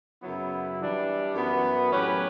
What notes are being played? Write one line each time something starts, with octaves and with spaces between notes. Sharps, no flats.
F#2 C#3 F#3 B3 E4
E3 G3 D4
F#2 E3 B3
A2 F#3 C#4 G4 B4